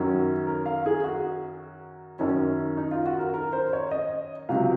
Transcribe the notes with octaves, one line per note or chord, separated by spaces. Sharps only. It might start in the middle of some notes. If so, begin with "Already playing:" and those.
Already playing: F#2 D#3 F#3 C#4 F#4
A#4
F5
G#4
F#4
F#2 D#3 F#3 C#4
D#4
F4
F#4
A#4
A#4
C5
C#5
D#5
C#2 C3 F#3 F5